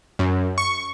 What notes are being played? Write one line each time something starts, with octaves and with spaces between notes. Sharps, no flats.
F#2
C#6